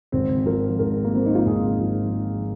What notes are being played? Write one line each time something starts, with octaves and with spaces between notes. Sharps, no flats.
G#1 C4
F3 A#4
G#2 A#4
A#3
F3 C4
D#4
F4
G#1 G#4
F3
F3